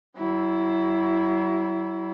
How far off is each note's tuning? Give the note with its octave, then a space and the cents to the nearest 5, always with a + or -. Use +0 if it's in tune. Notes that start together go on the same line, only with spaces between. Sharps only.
F#3 +40 E4 +0